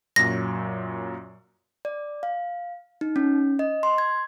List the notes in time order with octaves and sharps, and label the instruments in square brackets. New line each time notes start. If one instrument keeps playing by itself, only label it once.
[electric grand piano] F#2 A#2 F#3 [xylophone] A#6
[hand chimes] D5
F5
D#4
C#4
D#5
C6
G#6